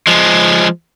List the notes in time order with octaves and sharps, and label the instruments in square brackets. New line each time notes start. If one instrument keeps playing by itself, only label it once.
[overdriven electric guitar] F3 G#3